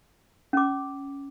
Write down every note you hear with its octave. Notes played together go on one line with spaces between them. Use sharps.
C#4 D6